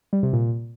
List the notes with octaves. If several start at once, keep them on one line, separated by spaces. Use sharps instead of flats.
G3
C3
A#2